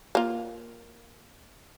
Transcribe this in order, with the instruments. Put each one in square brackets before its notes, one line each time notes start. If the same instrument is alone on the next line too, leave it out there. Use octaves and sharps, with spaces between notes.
[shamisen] A#3 F4